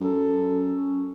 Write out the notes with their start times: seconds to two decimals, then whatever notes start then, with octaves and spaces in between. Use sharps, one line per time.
0.01 F#2 A4
0.73 C#4